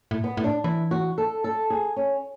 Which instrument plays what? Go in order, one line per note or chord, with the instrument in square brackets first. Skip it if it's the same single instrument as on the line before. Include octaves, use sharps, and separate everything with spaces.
[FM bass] A2
[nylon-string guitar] B3
[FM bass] A2
[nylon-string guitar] D4
[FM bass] E3 [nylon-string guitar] E4
[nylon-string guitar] F#4
A4
A4
G#4
C#4